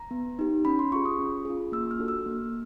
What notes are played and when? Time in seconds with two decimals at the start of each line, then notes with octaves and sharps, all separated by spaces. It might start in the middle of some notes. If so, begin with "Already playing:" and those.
Already playing: A#5
0.11 B3
0.39 D#4 G4
0.65 C#4 B5
0.79 C6
0.92 F4 G#4 C#6
1.05 D#6
1.19 C#4
1.45 F4 G#4
1.72 A#3 E6
1.91 F6
1.99 D4 F#4 A4
2.08 E6
2.26 A#3